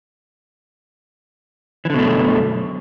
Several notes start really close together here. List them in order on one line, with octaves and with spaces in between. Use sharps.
E3 D3 B2 A3 F#2